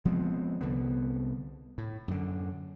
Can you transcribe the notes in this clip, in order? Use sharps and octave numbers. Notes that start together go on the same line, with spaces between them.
F3 G#3 B3 C4
C2 D3 B3
A2
F#2 D3